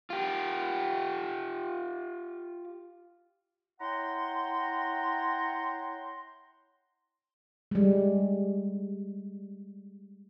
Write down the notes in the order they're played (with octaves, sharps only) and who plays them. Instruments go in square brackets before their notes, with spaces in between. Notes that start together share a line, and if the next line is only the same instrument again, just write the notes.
[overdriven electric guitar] F4 G4
[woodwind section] E4 C#5 F#5 G5 A#5 C6
[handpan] G3 G#3